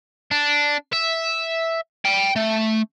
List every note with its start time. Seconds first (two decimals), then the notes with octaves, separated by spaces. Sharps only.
0.31 D4
0.93 E5
2.05 G5 B5
2.36 A3